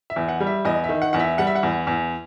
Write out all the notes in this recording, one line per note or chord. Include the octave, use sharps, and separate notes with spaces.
E5
E2
F#5
G3
E5
E2 D#5
D#3 E5
F#5
E2 F#5
E5
G3 F#5
E5
F#5
E2
E2